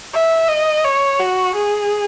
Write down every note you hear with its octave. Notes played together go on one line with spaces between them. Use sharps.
E5
D#5
C#5
F#4
G#4